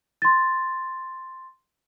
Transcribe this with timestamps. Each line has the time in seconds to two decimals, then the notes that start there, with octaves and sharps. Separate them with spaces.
0.22 C6 A6